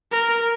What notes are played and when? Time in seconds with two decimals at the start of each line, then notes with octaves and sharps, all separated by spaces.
0.12 A#4